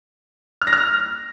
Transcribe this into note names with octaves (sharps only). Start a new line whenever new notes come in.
F6
A#6
F6